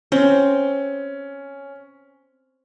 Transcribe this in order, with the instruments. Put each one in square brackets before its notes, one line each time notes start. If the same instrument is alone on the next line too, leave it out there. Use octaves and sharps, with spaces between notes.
[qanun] C4 [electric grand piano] C#4